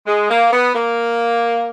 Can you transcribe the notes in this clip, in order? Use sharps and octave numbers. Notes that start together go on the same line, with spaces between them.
G#3
A#3
B3
A#3